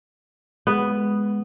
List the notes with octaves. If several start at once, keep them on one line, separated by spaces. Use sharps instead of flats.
G#3 B3